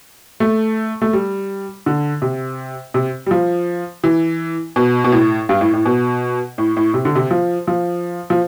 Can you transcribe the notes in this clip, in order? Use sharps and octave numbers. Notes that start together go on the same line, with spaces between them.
A3
A3
G3
D3
C3
C3
G3
F3
E3
B2
B2
A2
G2
A2
A2
B2
A2
A2
C3
D3
C3
F3
F3
F3